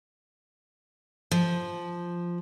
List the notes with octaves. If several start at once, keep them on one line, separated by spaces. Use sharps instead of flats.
F3